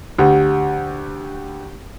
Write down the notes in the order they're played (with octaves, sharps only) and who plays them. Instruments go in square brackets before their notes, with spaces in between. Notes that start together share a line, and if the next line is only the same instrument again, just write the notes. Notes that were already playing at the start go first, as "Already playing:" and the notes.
[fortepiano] D2 [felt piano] G4